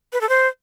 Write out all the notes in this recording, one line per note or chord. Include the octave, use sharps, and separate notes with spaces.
B4
A4
C5